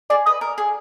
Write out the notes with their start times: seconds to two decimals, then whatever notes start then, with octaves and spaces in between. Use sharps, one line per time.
0.10 G#4 D5
0.26 B4 D#5
0.41 A#4
0.58 G#4